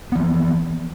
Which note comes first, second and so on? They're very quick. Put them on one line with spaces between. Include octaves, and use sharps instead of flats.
B3 E3 F3